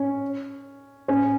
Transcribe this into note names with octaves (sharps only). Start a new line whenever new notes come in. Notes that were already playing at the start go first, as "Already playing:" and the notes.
Already playing: C#4
C#4